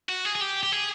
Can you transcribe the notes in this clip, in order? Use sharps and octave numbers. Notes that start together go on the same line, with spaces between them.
F#4
G#4
G#4
G4
G4
G#4